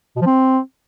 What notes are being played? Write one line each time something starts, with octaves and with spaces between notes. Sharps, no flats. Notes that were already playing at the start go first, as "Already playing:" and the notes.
B2
F3
C4